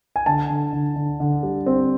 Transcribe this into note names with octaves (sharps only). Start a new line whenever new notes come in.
G#5
D3 A5
D3
D3
D3
D3
G3
C4